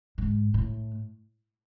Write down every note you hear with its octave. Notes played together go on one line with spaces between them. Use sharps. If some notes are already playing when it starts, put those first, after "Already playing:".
G#2
A2